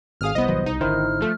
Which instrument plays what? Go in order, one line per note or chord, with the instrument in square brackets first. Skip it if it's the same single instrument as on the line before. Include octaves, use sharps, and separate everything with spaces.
[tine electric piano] G#1 G#4 [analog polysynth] F5 D#6 F6
[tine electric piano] C2 [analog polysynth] B3 D#5 [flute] C5
[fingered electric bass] A1 E3 F#3
[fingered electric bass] B1 [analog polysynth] D#4
[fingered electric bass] G#1 D3 [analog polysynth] D#3 [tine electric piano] D#4 E4 C5 [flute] F6
[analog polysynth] F3 A3